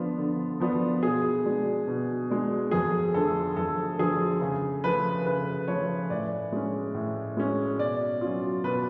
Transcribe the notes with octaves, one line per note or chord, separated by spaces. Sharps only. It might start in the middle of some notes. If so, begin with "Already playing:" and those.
Already playing: D3 F3 B3 D4 F4
D3
F3 B3 D4 F4
B2 G#4
G#3 D4
B2
G#3 D4
F2 G#4
D3 F3 A3 A4
F2 A4
D3 F3 A3 G#4
C#3
F3 A3 B4
C#3 B4
F3 A3 C#5
A2 D5
G#3 C#4
A2
G#3 C#4
B2 D5
F#3 C#4 F4
B2 B4